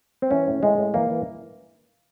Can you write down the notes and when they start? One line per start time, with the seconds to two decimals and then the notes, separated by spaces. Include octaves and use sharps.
0.22 C4
0.31 E3 C#4
0.47 A2
0.63 A2 G#3
0.78 A2
0.94 E3 A#3
1.10 E3